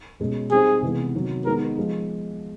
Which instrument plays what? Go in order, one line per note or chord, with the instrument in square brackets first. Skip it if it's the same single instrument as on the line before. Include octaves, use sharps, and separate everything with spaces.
[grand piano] B2 G#3 C#4
[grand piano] G3 C4 D#4 G4 C5 [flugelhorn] G#4
[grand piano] C3 E3 G#3 B3
C3 D#3 F#3
[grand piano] D#3 G#3 B3 D#4 [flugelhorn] A#4
[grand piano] F3 G#3